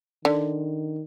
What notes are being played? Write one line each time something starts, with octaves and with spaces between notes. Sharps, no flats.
D3 D#3 D5